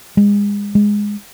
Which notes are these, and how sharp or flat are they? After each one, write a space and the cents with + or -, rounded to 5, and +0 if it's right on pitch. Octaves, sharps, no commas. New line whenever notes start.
G#3 -30
G#3 -5